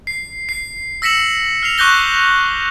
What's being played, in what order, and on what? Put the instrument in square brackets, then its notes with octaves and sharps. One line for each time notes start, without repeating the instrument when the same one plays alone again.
[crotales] C7
C7
E6 A#6 B6 C#7 E7 F#7
F6 C7 F7
C#6 D6 F#6 G6 A#6 G7
F7